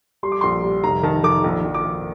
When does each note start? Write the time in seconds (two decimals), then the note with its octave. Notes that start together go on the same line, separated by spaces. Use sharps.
0.23 G3 C6
0.32 D6
0.41 A#1 C6
0.63 G3
0.83 F1 A#5
1.03 D#3 A5
1.24 D#3 D6
1.44 A#1
1.64 A#1
1.74 D6
1.85 A#1